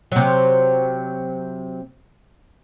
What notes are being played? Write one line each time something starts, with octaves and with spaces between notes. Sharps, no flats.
C3 F#3